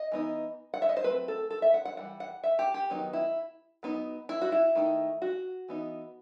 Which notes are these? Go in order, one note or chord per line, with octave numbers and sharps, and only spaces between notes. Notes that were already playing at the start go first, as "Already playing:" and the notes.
Already playing: D#5
E3 B3 D#4
F#5
E5
D#5
C5
F#3 A3 C4 B4
A4
A4
E5
F#5
F#5
E3 G3 F#5
F#5
E5
G4
G4
D#3 F#3 B3 D#4
E4
F#3 B3 D#4
E4
F#4
E4
D#3 A3 D#4
F#4
E3 B3 D#4